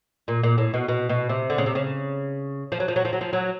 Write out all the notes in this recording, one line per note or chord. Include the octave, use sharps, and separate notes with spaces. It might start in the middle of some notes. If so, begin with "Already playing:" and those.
A#2
A#2
A2
B2
B2
B2
C3
D3
C#3
C3
C#3
F3
F#3
F3
F#3
F3
F#3
F3
F#3